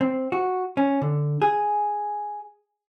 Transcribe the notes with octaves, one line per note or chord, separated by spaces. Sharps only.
C4
F#4
C#4
D3
G#4